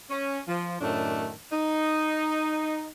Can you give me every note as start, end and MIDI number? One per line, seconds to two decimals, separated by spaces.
0.10 0.40 61
0.48 0.76 53
0.81 1.32 42
0.81 1.32 45
0.81 1.32 51
0.81 1.32 57
0.81 1.32 62
1.52 2.88 63